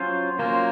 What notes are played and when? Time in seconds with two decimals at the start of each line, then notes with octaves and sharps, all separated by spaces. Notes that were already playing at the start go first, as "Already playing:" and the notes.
Already playing: F#3 C#4 F4 C5
0.39 F#3 A#3 C#4 F4 C5